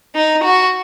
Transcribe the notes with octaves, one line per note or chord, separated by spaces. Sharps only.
D#4
F#4